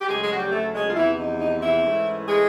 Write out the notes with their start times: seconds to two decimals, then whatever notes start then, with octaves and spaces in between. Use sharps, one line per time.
0.01 G4
0.08 D2 C#3 F#3 G#3 G#4
0.23 G#3 G#4
0.33 F#4
0.38 G3 G4
0.52 A3 A4
0.74 G#3 G#4
0.89 F4
0.96 E2 C3 E3 F3 E4
1.17 D#4
1.40 D#4
1.61 E3 E4
1.84 G#2 E3 A3 C#4
2.27 G#3 G#4